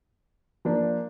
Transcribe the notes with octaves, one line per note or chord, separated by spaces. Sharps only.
F3 A#3 D4